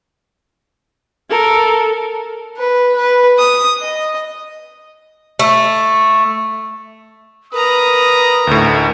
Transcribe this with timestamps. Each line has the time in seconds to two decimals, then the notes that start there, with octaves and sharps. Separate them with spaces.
1.29 A4 A#4
2.58 B4
2.96 B4
3.38 D#6
3.80 D#5
5.39 A3
7.53 A#4 B4 A#5 D#6
8.47 D2 A2 D#4